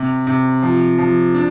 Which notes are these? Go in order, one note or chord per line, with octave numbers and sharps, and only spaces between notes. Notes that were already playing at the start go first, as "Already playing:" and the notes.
Already playing: C3
C3
F3
F3
D4